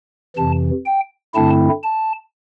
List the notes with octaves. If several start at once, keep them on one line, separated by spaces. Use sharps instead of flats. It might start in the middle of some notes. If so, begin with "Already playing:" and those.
F2 C3 E3 A5
G5
G2 D3 A3 C4 E4 A5
A5